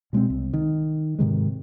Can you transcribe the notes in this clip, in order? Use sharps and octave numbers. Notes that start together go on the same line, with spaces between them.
B2 G#3 A#3 C4
C2
D#3
G#2 C3 D#3 G#3